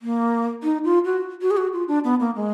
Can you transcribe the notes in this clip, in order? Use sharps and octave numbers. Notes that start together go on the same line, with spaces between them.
A#3
D#4
F4
F#4
F#4
G#4
F#4
F4
D4
B3
A#3
G#3